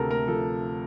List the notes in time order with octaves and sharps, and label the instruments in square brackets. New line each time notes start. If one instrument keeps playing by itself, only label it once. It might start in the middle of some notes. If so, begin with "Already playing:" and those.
Already playing: [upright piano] D2 C3 A4 A#4
A3 A#4
F3 A4